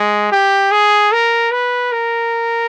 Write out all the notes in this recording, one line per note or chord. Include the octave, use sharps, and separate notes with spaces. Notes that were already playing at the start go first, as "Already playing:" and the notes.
Already playing: G#3
G4
G#4
A#4
B4
A#4